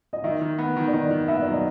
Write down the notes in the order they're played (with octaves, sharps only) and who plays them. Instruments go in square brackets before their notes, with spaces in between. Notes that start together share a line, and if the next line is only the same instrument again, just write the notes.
[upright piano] D#5
[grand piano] D#3 [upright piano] E5
[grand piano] D#3
B3
D#3
[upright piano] D5
[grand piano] D#3 [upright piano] D#5
[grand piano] D#3
[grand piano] B3 [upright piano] E5
[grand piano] F#3 [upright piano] D5
[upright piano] D#5